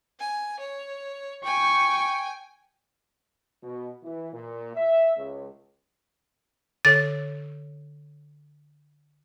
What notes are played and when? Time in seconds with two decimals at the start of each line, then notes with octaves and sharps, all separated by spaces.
0.20 G#5
0.60 C#5
1.44 G5 G#5 C#6
3.63 B2
4.03 E3
4.33 A#2
4.75 E5
5.17 C#2
6.85 D3 A4 C#5 A6